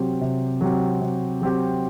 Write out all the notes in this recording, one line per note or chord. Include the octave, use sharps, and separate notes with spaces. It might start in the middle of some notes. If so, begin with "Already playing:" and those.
Already playing: C3 F#3 C4 G4
C3
F#3 C4 G4
C3
F#3 C4 G4